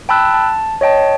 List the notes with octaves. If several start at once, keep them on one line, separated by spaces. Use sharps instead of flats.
G5 A5 B5 E6 F#6
A5
C#5 D#5 G5 A5